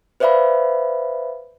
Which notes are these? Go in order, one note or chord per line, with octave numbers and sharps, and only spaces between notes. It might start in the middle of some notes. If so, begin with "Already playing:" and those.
B4 C5 D5 E5 F5 B5